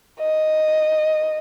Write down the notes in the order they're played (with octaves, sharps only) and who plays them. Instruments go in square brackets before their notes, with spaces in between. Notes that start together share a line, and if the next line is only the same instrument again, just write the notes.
[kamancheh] D#5